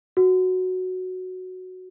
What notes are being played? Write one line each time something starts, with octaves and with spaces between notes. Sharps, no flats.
F#4